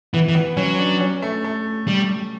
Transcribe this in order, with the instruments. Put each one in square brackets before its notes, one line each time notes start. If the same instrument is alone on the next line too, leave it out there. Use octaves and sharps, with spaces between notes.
[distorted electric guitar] E3 [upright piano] B3
[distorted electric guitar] E3
[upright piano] B3
[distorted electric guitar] F#3 [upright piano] C#4
[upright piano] D4
C#4
A3
A3
[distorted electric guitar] G3